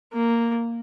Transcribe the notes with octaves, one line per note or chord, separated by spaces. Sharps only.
A#3